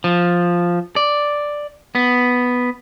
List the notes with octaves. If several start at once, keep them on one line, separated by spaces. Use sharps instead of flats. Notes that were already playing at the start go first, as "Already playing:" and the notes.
F3
D5
B3